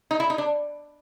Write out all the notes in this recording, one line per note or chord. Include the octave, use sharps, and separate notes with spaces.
D#4
E4
D#4
D4